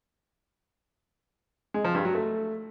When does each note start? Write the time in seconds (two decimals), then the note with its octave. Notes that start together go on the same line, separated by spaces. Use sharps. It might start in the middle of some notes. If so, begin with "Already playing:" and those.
1.74 G#3
1.84 F3
1.95 G2
2.05 F#3
2.15 A3